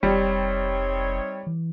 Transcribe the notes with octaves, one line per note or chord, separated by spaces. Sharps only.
F1 G3 C4 D#4 C#5
E3